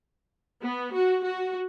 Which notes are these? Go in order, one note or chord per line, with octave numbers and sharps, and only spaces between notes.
B3
F#4
F#4